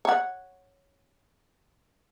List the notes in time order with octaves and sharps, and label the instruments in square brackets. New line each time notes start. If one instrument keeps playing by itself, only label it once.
[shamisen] C#5 F#5